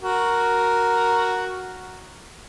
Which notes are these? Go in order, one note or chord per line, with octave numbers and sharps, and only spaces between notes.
F#4 A#4